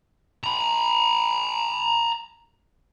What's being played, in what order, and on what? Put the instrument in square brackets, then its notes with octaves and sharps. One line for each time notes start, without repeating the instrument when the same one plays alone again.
[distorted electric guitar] A#5 B5